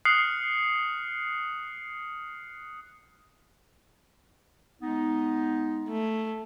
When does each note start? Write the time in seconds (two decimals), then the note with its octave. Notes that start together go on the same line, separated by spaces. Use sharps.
0.05 D#6 F6 F#6 C7 C#7 F#7
4.82 G#3 B3 D#4
5.88 A3